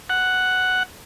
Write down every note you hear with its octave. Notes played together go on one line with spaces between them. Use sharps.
F#5